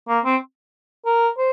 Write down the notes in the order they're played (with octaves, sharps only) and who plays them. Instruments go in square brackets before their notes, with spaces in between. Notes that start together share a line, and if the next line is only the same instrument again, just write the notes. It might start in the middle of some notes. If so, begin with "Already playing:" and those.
[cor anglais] A#3
C4
A#4
C5